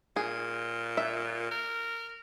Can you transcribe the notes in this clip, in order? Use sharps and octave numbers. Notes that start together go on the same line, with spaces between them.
A#2 G#4
E5
A#4